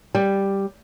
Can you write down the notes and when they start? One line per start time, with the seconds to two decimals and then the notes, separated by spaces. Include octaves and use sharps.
0.15 G3